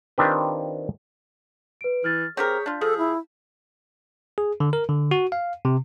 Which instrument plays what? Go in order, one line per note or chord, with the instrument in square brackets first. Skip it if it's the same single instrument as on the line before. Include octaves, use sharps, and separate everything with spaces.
[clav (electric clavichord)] D#3 C4 D4 F4 G4 B4
[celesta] B4 D7
[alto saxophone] E3 [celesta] F6 A6
[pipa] C4 G4 A#4 [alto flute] G#4 [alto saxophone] C#5 [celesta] G6 B6
[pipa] D4 F4
[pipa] F3 [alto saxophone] G#4 [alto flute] A4
[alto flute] E4
[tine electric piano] G#4
D3
A#4
D3
F#4
F5
C3